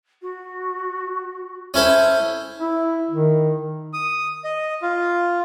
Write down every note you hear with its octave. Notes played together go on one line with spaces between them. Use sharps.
F#4
C#4 E4 A4 C5
E4
D#3
D#6
D#5
F4